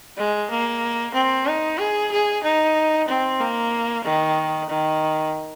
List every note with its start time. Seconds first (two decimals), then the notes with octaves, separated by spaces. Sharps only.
0.17 G#3
0.50 A#3
1.14 C4
1.47 D#4
1.79 G#4
2.11 G#4
2.44 D#4
3.08 C4
3.40 A#3
4.04 D#3
4.69 D#3